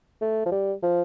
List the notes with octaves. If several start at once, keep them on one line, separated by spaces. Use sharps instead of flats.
A3
F3
G3
F3